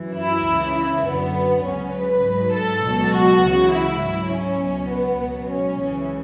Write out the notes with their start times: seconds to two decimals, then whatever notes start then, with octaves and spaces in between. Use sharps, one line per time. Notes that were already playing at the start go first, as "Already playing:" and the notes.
Already playing: F#2 E3
0.16 E4
0.46 C#2 C#3 E3
0.75 E4
1.05 F#2 D3 F#3 B3
1.64 C#2 C#3 F#3 C#4
1.94 B4
2.23 G#2 F#3
2.53 A4
2.83 C#2 B2 F#3
3.11 F#4
3.41 C#2 C#3 E3
3.72 E4
4.00 G#2 F#3
4.30 C#4
4.59 C#2 B2 F#3
4.89 B3
5.19 C#2 B2 F#3
5.49 C#4
5.79 C#2 C#3 E3